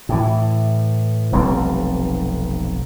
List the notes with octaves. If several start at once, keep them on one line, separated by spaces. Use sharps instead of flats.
A2 E3
F1 B1 G3 C4